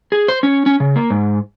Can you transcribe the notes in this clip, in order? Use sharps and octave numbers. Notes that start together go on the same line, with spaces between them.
G#4
C5
C#4
C#4
C#3
A#3
G#2